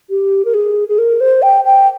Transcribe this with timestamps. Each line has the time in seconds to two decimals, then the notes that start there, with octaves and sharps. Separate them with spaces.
0.10 G4
0.45 A#4
0.54 G#4
0.89 G#4
0.98 A#4
1.21 C5
1.42 G5
1.65 G5